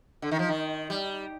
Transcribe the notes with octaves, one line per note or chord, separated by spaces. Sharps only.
D3
D#3
F3
D#3
G3